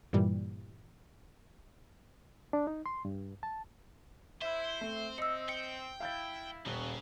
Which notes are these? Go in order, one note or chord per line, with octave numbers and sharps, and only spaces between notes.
G2 A#2 E3 G3
D4
D#4
C6
G2
A5
E4 C5 E5
A3 C4
D#5 E6 C#7
G5 C#7
E4 F5 G6 A6
D#1 C#3 B3 G7